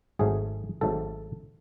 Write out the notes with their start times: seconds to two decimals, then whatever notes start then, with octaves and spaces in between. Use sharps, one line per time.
0.19 G#1 G#2 F#3 A3 G#4
0.81 G#1 G#2 F#3 A3 A4